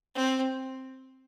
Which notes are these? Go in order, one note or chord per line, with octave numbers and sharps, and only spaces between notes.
C4